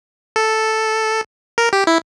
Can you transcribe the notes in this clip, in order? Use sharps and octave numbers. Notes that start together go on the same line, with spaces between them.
A4
A#4
G4
E4